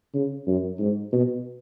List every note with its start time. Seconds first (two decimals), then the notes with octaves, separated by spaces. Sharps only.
0.14 C#3
0.47 F#2
0.79 G#2
1.12 B2